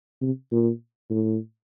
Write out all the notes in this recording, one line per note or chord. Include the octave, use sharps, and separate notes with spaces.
C3
A#2
A2